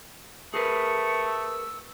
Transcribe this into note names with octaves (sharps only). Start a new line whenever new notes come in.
A3 G#4 A#4 B4 C#7
E6